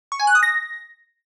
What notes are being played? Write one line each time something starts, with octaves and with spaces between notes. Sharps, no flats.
C#6
G#5
F#6
D#6
A#6